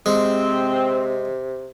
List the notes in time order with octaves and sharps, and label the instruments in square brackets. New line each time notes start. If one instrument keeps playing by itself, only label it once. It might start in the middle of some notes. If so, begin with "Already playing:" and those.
[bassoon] C3 [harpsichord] G#3 [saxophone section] C4